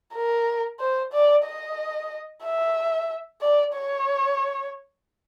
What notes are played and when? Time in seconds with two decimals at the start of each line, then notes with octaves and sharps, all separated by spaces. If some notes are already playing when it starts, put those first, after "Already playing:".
0.14 A#4
0.80 C5
1.13 D5
1.45 D#5
2.44 E5
3.41 D5
3.74 C#5